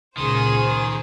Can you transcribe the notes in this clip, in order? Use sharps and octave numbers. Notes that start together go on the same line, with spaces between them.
C#2 A#2 D#3 G#4 C5 C6 D#6